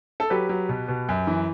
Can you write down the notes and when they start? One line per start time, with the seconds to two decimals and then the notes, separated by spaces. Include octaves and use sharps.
0.20 A4
0.30 F#3 G4 B4
0.49 F#3
0.69 B2
0.88 B2
1.09 F#2
1.27 E3